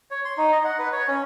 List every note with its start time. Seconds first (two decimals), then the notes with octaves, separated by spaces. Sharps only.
0.11 C#5
0.25 C6
0.37 D#4
0.52 D#5
0.64 F#5
0.79 B4
0.92 C#5
1.08 C#4